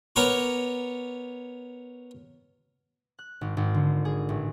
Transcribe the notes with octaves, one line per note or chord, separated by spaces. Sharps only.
B3 A#4 C#5 C#6 D6
F#6
G#1
G#1
D3
G#4
A1